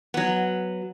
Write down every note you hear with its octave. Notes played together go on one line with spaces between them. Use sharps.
F#3 B3